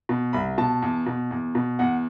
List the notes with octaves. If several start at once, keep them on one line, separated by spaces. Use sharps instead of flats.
B2
C2 B5
B2 A5
E2
B2
E2
B2
E2 F#5